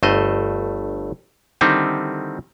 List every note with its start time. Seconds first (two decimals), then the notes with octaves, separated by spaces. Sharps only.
0.03 G1 G2 A3 C5 D#5
1.61 D3 D#3 G3 C4 D#4 E4